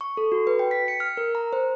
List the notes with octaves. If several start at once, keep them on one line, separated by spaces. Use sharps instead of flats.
C#6
A4
F#4
B4
G5
B6
C#7
F6
A#4
A#5
C5